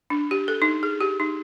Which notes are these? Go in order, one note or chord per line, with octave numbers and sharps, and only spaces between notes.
D4
G4
A4
D#4
G#4
G4
D#4